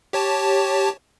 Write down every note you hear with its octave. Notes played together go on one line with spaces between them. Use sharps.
G4 C#5 A5